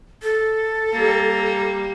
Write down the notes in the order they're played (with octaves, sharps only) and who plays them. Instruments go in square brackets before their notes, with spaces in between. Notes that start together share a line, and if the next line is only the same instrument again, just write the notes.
[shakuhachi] A4
[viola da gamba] G3 A#3